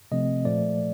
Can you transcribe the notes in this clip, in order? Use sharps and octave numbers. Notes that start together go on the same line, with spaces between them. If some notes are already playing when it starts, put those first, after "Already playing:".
C3 F3 A3 C4 D#5
A#2 F3 A3 D5